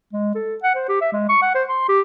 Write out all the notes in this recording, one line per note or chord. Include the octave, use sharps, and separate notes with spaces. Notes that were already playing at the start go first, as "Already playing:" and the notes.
G#3
A4
F#5
C5
G4
E5
G#3
C#6
F#5
C5
C6
G4